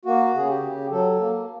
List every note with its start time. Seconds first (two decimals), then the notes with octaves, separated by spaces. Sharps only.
0.05 A#3 F#4
0.34 C#3 G#4
0.49 G4
0.62 C#3
0.91 F#3 A4
1.19 A#3